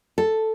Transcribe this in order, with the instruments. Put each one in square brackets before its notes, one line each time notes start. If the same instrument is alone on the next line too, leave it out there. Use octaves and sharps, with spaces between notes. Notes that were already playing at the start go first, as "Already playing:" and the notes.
[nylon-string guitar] A4